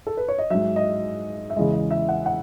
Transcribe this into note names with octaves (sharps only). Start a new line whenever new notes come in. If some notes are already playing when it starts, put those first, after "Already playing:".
A4
B4
C#5
D#5
G#2 F#3 E5
D#5
E5
E2 C#3 E3 G#3 D#5
D#5
E5
F#5
F#5